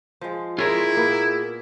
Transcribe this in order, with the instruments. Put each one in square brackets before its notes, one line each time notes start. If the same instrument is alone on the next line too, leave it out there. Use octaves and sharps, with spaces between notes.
[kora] F3 G#3
[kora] G#3 C#5 [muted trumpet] E4 [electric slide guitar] F4 G#4 A#4
[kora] A#2 A#3 B3